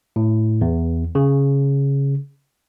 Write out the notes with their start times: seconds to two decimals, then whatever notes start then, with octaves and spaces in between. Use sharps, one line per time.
0.16 A2
0.61 E2
1.15 C#3